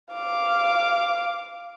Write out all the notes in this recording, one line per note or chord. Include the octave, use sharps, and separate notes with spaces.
F5 D6